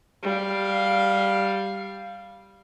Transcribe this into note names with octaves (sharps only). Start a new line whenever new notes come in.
G3 F5